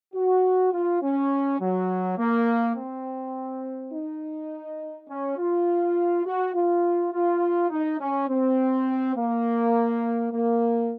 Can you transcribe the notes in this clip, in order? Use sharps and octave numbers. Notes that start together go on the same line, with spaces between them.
F#4
F4
C#4
F#3
A#3
C4
D#4
C#4
F4
F#4
F4
F4
D#4
C#4
C4
A#3
A#3